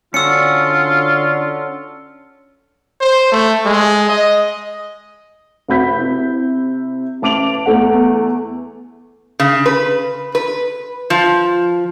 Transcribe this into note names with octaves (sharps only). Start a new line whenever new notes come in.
D3 C#4 D4 F4 F#4 E6 C#7
C5
A3
G#3
D#5
F1 F#4 B5 G6 B6
C3 E4
A1 A5 D6 D7 F7 F#7
E2 A3 F#5
C#3
B4
B4
F3